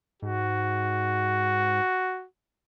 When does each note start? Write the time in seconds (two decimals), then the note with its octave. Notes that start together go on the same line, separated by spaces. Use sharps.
0.22 G#2 F#4